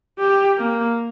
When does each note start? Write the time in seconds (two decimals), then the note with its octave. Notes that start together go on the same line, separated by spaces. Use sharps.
0.19 G4
0.58 A#3